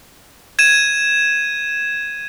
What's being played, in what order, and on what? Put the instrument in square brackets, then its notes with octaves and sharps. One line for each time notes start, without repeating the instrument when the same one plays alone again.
[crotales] G#6 D#7 E7